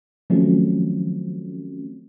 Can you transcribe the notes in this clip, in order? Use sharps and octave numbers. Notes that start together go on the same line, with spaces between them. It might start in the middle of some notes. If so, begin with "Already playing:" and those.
D#3 F3 F#3 A3 C4 C#4